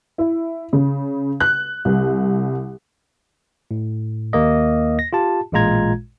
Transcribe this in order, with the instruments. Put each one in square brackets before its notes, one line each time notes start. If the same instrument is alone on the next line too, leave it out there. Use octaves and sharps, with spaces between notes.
[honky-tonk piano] E4
C#3
F#6
C2
[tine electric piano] A2
D#2 A#3 D#5
A#6
F4 G4 A5
A1 A#2 G#3 F4 A#5 G#6